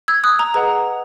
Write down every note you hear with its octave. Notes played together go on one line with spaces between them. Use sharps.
E6 G#6
D#6 F#6
A#5
G#4 B4 D#5 F#5 A#5